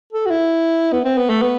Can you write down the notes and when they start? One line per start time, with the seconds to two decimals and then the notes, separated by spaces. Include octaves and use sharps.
0.13 A4
0.26 F#4
0.31 E4
0.92 B3
1.04 C4
1.18 B3
1.30 A3
1.42 B3